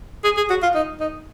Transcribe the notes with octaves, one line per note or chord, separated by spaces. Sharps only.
G#4
G#4
F#4
F4
D#4
D#4